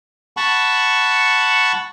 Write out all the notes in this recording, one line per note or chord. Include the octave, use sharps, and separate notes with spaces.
F#5 A5 B5 C#6